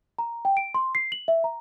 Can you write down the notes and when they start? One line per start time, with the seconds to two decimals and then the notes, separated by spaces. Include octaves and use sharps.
0.18 A#5
0.45 G5
0.57 D7
0.75 C6
0.95 C7
1.12 F#7
1.28 E5
1.44 A#5